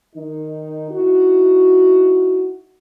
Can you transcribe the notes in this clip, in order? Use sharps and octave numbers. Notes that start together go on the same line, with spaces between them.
D#3 D#4
D#4 E4 F#4